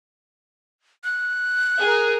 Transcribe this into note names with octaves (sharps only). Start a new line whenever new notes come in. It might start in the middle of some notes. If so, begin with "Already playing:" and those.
F#6
G#4 A#4